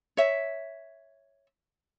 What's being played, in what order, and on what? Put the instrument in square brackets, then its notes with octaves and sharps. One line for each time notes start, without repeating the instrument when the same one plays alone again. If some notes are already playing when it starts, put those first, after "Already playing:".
[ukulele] C#5 E5